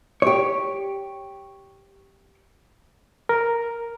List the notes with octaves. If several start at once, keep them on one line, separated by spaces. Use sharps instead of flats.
G4 C#5
A#4